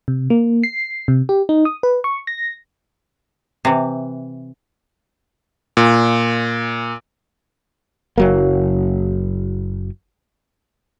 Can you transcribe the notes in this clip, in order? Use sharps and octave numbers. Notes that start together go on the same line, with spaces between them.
C3
A#3
C7
C3
G4
D#4
D#6
B4
C#6
A#6
C3 E3
A#2
F#1 F#3 A#3